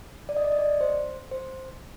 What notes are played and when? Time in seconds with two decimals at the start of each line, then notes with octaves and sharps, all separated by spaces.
0.29 D5
0.37 D#5
0.44 D5
0.52 D#5
0.59 D5
0.81 C5
1.31 C5